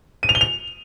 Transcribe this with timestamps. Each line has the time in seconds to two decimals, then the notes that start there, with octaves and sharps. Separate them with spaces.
0.23 D#7
0.29 F7
0.35 G7
0.41 F7